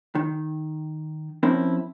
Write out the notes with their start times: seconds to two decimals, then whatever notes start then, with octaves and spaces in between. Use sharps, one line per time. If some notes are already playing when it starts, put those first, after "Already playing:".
0.15 D#3
1.43 F3 C4 C#4 E4 A#4